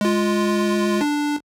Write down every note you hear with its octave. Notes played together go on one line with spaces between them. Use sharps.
G#3 F4
D4